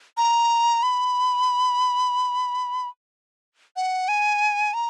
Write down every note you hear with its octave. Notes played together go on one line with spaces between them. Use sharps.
A#5
B5
F#5
G#5
A#5